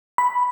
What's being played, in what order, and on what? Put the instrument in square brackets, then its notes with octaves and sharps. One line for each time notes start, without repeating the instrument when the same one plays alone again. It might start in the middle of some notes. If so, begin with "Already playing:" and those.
[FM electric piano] B5